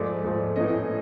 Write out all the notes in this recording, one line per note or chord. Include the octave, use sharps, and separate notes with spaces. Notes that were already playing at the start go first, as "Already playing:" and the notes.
Already playing: G#2 F3 A3 D5
G#2 F3 A3
A2 E3 A3 C#4 D#5